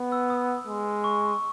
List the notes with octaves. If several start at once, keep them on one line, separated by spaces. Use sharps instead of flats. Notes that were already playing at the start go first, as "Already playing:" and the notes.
Already playing: B3
E6
D#6
G#3
C#6